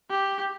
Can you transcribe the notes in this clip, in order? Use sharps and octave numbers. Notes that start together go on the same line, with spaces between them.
G4